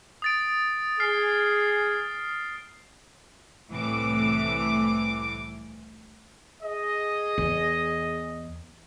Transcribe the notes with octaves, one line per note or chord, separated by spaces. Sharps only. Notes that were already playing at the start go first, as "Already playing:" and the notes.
D#6 A6 D7
G#4 F6 C7
C2 A2 E3 D6
G#4 D#5
E2